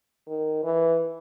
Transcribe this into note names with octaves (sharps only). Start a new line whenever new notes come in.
D#3
E3